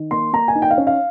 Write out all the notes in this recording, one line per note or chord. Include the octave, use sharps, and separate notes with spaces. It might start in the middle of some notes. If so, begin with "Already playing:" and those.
Already playing: D#3
A#3 C6
A#3 A#5
G#5
D#4
G5
F5
C#4
F5